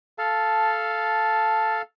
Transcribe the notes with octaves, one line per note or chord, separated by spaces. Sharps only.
A4 F5 A5